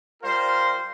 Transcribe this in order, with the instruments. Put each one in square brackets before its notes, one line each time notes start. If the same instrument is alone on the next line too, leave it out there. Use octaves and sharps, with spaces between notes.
[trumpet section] G3 F4 A#4 C5 F5 C6